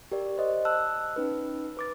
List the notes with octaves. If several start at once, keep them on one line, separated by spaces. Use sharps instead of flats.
G4 A#4 D5
C5 D#5
A5 E6 F#6
C#4 D#4 B4
B4 D6 A6